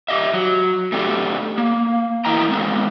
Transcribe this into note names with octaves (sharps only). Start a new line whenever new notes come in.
G4 D#5 E5
F#3
A3 C4 D4 F4 G4
A#3
E2 A#3 E4 D#5 G5 A#5
G#3 A3 B3 C4